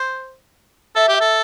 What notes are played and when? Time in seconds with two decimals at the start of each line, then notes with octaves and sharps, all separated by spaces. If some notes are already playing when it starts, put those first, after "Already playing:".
Already playing: C5
0.95 A4 E5
1.09 G4
1.21 A4